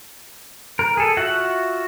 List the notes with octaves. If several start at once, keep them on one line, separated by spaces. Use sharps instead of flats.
A#4
G#4 A4
F4 F#4 E5 F#5